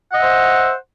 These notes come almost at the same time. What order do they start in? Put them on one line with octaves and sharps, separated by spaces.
F#5 D#5 E5 C5